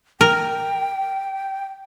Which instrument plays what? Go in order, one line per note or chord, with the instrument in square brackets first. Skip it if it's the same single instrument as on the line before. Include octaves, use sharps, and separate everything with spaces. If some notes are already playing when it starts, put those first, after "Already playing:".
[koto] A#4 [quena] G5